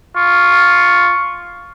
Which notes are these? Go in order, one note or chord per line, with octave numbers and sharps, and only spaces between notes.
F4 C#6